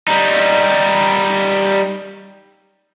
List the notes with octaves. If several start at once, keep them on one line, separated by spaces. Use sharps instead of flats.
G3 D#4